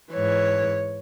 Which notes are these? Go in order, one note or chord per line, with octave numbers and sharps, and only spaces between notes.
G#2 E3 C#5